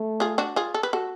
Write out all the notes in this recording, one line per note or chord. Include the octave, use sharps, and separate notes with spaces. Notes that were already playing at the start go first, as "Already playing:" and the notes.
Already playing: A3
F4 G#4
D4 F#4
F4 G#4
A4
B4
F#4 A4